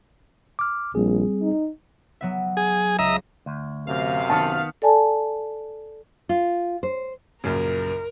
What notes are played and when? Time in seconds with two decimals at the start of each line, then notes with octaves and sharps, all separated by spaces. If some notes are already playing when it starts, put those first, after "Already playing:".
0.59 D6 F6
0.95 A#1 G3 C4 G#4
1.42 D#4
2.21 F#3 B3 E5
2.57 G#4
2.99 C#2 D#5 E5 A#5
3.46 D2
3.87 F#2 C3 F5
4.30 D#3 B3 A5
4.82 A4 D5 G#5 A5
6.29 F4
6.83 C5
7.44 A#1 F#2 C#3 A#4